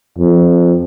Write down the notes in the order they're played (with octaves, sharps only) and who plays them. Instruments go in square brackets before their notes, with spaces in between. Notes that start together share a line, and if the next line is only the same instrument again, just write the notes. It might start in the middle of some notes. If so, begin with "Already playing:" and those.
[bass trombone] F2